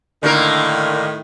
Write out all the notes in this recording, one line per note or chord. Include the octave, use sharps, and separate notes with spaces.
A2 D3 D#3 A#3 A#4